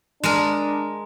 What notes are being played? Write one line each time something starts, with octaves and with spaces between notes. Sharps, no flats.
G#3 D4 A#4